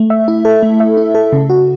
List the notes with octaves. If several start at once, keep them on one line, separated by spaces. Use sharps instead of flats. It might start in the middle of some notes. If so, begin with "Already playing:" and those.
Already playing: A3
E5
E4
A4
A3
E5
E4
A4
C#3
F#4